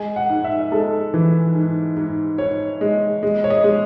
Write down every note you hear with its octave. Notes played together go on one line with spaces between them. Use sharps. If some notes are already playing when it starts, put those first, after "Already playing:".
Already playing: G#3 G#5
F#5
G#2
E5
G#3 A4
E3
G#2
G#2
G#2 C#5
G#3
G#3
C#5
D#5
G#3